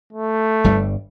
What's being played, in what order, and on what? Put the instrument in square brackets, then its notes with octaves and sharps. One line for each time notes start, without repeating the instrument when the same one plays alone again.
[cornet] A3
[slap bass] G1 G2 G3